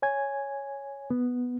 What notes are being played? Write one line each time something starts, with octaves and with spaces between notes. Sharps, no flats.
C#5 G#5 G#6
B3